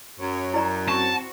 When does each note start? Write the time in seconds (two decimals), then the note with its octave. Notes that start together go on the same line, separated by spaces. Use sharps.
0.20 F#2 C#5
0.54 E4 D5 A#5
0.88 C4 F#4 A5 C#6